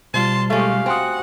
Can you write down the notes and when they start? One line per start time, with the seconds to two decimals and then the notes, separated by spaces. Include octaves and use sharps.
0.14 B2 G3 F4 C5 A5 C6
0.50 G#3 A3 C#4 G4 F5
0.86 C4 F#4 F#5 G#5 C6 D#6